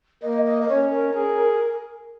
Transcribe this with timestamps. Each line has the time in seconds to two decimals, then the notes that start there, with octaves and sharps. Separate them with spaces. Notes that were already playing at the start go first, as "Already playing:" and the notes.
0.23 A#3 D#5
0.46 D#5
0.61 A#4
0.68 C#4 C#5
0.91 A#4
1.14 G#4